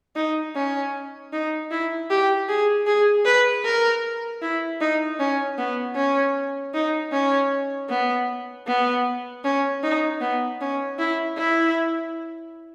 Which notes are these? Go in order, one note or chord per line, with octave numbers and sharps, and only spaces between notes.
D#4
C#4
D#4
E4
G4
G#4
G#4
B4
A#4
E4
D#4
C#4
B3
C#4
D#4
C#4
B3
B3
C#4
D#4
B3
C#4
E4
E4